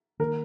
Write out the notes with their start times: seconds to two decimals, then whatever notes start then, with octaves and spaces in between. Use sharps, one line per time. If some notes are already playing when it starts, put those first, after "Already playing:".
0.19 D#3 A#3 A#4